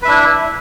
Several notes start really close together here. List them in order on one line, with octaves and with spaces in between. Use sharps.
B4 E5 D4 E4